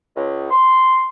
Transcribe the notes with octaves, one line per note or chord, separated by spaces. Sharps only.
C#2
C6